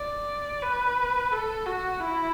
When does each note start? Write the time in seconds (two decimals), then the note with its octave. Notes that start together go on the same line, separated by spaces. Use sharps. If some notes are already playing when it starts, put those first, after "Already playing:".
Already playing: D5
0.63 B4
1.32 A4
1.66 F#4
2.00 E4